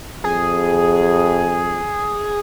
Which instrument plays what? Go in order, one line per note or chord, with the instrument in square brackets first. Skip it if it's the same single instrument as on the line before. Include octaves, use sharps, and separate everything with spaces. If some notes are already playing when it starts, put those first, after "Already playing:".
[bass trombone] F2 [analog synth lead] G#4